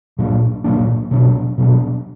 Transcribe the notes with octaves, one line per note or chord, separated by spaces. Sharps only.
A#2 F#3 A#3 D4
A#2 F#3 A#3 D4
B2 F#3 B3 D4
B2 F#3 B3 D4